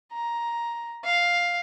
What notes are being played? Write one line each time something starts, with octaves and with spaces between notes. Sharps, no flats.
A#5
F5